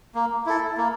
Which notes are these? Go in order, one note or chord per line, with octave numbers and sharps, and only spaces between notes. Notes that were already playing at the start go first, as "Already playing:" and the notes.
A#3
E4 A4
A#3